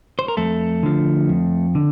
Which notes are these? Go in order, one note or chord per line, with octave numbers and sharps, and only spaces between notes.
C5
A#4
F2 A3 A4
D3 F3
F2
D3